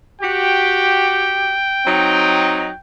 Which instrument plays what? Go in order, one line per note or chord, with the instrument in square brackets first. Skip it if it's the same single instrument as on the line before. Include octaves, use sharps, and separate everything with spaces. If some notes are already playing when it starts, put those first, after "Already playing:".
[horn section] F#4 G4 [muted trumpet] G5
[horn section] F#3 C4 D#4